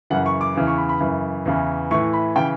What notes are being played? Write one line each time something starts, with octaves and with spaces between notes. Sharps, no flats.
F#2 C#3 E3 F#5
C#6
D6
E2 C#3 E3
C#6
B5
B5
F#2 C#3 E3
E2 C#3 E3
A2 E3 C#6
B5
C#3 E3 G5